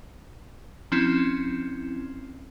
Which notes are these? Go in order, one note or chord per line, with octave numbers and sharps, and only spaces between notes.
F3 C4 C#4 E4